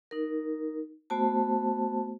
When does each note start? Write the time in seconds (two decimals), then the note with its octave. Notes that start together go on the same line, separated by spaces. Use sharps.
0.11 D#4 A#4
1.10 A3 B3 F#4 C5 A5